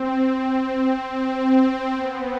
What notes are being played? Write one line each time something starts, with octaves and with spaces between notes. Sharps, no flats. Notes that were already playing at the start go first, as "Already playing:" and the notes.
Already playing: C4
C4
B3